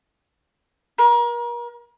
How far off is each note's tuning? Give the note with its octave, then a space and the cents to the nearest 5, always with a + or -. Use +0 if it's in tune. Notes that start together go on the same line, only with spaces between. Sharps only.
A#4 +35